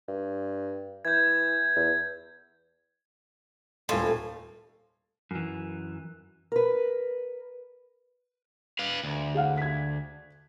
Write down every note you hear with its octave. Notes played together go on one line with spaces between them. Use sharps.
G2
E3 G6 G#6
E2
D#1 A2 F5 C6
F#2 E3
A#4 B4
B4 F5
D2
G#4 F5 F#5
G#6 B6